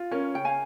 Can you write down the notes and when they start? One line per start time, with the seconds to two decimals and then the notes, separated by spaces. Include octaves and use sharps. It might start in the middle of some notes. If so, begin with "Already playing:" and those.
Already playing: F4
0.11 C#4 A#4 C#5
0.35 C#3 G5
0.45 F5 G#5